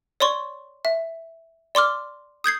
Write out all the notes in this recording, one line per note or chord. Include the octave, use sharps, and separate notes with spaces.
C#5 D5 C6 C#6
E5
D5 C6 D6 F6
D#6 G6 G#6 C7